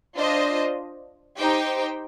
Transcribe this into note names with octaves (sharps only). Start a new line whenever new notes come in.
D4 F4 C5 D#5
D#4 G4 C5 G5